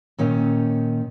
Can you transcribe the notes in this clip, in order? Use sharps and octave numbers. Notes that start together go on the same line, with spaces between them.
A#2 D#3 C#4 D#4